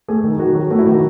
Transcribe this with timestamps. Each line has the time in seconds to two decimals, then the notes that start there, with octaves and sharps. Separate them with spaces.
0.08 A3 G#4
0.24 D#3
0.39 D#3 F#4
0.54 F#3
0.71 A3 F#4
0.79 E4
0.86 D#3 F#4